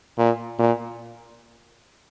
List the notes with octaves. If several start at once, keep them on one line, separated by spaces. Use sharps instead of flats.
A#2
A#2